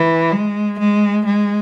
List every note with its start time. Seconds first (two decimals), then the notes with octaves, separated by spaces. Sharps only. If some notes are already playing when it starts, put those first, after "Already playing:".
Already playing: E3
0.32 G#3
0.79 G#3
1.26 G#3